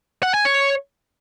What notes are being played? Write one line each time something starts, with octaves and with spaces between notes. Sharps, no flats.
F#5
G#5
C#5